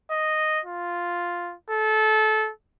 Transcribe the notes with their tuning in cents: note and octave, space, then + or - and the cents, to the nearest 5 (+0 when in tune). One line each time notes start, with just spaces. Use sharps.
D#5 -5
F4 +0
A4 -25